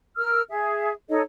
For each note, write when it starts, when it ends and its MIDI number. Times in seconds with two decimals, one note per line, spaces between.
0.17 0.42 70
0.17 0.42 88
0.17 0.42 89
0.49 0.92 68
0.49 0.92 76
1.09 1.21 63
1.09 1.21 69
1.09 1.21 73
1.09 1.21 75